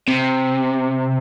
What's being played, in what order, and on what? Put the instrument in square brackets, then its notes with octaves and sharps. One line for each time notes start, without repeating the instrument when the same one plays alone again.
[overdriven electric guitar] C3